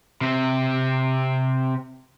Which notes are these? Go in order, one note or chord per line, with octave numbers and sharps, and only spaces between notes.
C3 C4